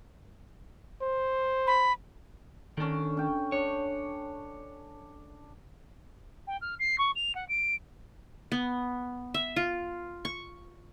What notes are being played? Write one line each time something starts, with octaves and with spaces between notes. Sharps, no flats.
C5
B5
D3 D#3 C#4 D4
C#4 G5
D4 C#5
G5
F6
C7
C#6
F7
F#5
D7
B3
E5
F4
C#6